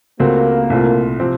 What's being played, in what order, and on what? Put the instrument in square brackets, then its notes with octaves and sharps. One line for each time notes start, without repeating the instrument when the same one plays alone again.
[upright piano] C#2 C#3 A3 C4 F#4 [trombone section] A#3
[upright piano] C2 A#2 A3 C4 F4
C3 F3 C4